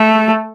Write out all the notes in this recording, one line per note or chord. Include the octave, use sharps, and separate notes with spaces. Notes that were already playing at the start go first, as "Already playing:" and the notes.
Already playing: A3